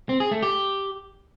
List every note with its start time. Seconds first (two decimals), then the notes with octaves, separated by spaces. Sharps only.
0.09 C4
0.20 G#4
0.31 A3
0.43 G4